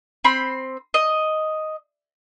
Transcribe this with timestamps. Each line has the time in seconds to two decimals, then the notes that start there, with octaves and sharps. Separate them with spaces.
0.24 C4 B5 C6
0.94 D#5